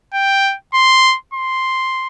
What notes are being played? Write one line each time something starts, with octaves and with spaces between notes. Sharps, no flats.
G5
C6
C6